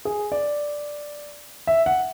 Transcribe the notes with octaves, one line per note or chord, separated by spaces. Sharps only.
G#4
D5
E5
F#5